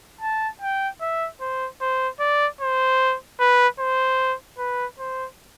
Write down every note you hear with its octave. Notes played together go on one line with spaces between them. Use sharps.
A5
G5
E5
C5
C5
D5
C5
B4
C5
B4
C5